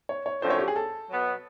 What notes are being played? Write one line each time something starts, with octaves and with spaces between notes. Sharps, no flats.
C#5
C#5
F#2 D3 F3 A3 C4 C5
C#5
G4
G#4
A4
B2 F#3 B3